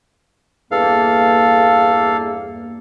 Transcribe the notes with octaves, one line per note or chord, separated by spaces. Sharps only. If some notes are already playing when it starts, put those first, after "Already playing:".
E2 G2 A#3 A4 F5